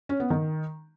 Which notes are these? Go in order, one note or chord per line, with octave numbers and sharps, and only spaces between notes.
C#4
B3
D#3